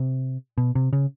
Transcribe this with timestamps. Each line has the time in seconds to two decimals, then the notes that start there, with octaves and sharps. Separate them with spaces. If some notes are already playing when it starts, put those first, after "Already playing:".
Already playing: C3
0.58 B2
0.75 C3
0.93 C#3